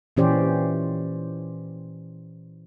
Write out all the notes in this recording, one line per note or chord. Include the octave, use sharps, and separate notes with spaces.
A#2 E3 C#4 G4 C5 D5